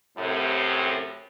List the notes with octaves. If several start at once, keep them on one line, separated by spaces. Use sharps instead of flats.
F#2 A2 C3